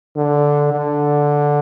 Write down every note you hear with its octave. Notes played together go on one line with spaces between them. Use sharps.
D3
D3